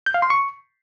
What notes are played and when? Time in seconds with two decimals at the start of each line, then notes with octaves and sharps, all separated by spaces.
0.06 G6
0.14 F5
0.22 C6
0.30 C#6